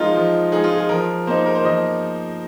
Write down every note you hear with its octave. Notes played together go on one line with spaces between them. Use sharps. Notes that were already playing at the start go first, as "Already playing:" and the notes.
Already playing: F3 G#3 D#4 F4 A#4
F3
G#3 D#4 G#4
F4
G#4
F3 A#4
A#3 D#4 C5
A#4
C5
F3 D#5